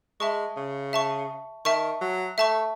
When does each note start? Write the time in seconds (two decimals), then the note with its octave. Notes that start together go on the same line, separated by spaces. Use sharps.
0.20 G#3 E5 A5 C#6
0.57 C#3
0.93 E5 A5 C#6
1.65 D#3 E5 A5 C#6
2.01 F#3
2.38 A3 E5 A5 C#6